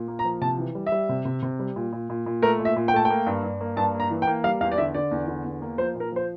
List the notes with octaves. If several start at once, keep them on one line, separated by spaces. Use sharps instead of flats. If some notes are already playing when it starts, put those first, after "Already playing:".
Already playing: A#2
A#3
A#5
F3
C3 A5
E3
G3
E5
G3
C3
C3
C3
G3
A#2
A#2
A#2
A#2
A3 A#4
A#2
E5
A#2
G5
A3 A5
G5
A#3
G2
G2
A#3
G2 A5
A#3
A#5
E3
G5
A#3
G3 F5
E2 F5
D5
D3 E5
D3 D5
E2
D3
E2
A#3
F3 C5
A#2
A#4
F3 C5